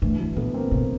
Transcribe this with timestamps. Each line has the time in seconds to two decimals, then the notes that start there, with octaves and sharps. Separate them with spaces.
0.02 A2 D3 E3
0.19 E3 F#3
0.36 A#2 A3 B3
0.54 A#3 C4
0.72 B2